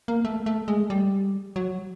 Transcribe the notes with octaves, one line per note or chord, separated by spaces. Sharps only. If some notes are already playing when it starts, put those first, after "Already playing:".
A#3
A3
A3
G#3
G3
F#3